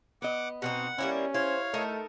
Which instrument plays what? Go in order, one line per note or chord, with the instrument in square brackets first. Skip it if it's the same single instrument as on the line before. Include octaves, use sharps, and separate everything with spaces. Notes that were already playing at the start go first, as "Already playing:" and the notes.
[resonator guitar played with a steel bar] B3 D#5 [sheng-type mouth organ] F#5 D6
[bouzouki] B2 C4 D#4 [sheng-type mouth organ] F#5
[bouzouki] G3 A#3 E4 [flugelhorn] C#4
[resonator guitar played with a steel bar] E4 [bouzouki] C5 [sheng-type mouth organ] C#5 F5
[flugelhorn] A3 [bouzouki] D#4 A4 A#4